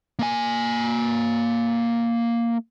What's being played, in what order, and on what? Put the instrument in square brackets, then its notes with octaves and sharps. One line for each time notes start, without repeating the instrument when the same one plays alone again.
[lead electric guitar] A#3 G#5